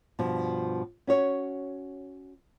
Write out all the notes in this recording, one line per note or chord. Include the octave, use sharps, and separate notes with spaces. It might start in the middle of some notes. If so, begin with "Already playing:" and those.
G2 B2 F3
C#4 F#4 C#5